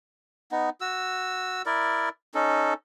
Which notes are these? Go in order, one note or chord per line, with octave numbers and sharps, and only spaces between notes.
B3 D#4
F#4 E6
E4 A#4 D5
C#4 D#4 A4